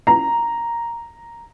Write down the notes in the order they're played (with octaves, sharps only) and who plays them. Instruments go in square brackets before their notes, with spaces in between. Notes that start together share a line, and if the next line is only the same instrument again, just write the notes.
[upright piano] A#5